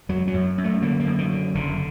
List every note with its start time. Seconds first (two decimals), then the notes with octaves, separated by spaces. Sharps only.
0.09 F#2 F#3
0.28 F#3
0.34 F#2
0.58 F#2
0.64 A3
0.82 D3 A#3
1.00 A#3
1.06 F#2
1.18 D#3
1.31 D3
1.55 F#1 D3